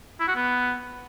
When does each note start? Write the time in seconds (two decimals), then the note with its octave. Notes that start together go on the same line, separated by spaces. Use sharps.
0.20 E4
0.28 F#4
0.36 B3